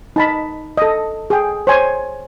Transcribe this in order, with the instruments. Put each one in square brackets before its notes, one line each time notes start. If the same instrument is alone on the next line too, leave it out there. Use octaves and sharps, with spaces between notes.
[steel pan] D#4 A5 B5
A4 D#5
G#4 G5
C5 C#5 G#5